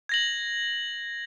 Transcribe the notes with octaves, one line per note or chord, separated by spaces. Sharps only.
G#6 A#6 F#7